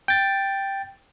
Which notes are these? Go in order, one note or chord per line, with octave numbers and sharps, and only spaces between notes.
G5 A6